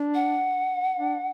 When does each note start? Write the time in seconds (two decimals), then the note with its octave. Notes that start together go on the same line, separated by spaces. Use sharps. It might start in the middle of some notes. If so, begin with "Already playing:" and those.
Already playing: D4
0.15 F#5
0.97 D4